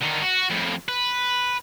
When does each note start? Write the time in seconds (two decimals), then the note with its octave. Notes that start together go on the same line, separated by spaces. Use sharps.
0.02 D3 D#3
0.22 F#4
0.50 F2 A2
0.88 B4